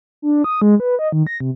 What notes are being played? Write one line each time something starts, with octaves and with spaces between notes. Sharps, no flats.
D4
D#6
G#3
B4
D#5
D#3
A#6
C3